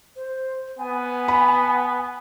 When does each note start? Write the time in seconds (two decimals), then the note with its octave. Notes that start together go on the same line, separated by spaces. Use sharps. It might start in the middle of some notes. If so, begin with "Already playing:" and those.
0.16 C5
0.79 B3 G#5
1.28 B5